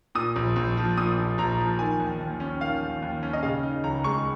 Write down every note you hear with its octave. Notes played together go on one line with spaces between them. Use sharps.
A#2 D#6
A#1
A#1
F3
A#2 D#6
A#1
A#1 A#5
F3
D#3 G#5
D#2
D#2
C#4
D#3 F5
D#2
D#2
C#4
D#5
C#3 F5
D#4
C#2 A#5
G#3 C#6